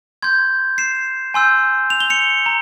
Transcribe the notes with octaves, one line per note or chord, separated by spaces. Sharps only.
C6 G6 G#6
C7 E7
G#5 C6 E6 G6
F7
G7
C#7 F7
A#5